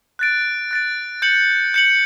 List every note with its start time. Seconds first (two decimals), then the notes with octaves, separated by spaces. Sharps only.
0.19 F#6 A6 D7
0.71 F#6 A6 D7
1.22 G6 C#7 F#7
1.74 G6 C#7 F#7